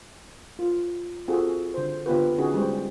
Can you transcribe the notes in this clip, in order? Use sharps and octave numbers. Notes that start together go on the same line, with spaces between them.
F4
C4 F4 F#4 G#4 A4
D3 C5
D3 B3 F4 G4 B4
D3 C#4 D#4 F#4 G#4
G3 G#3 G4 C5